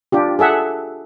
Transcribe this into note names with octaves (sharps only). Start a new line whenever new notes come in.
D4 F4 G4
G#4 A4 E5 F#5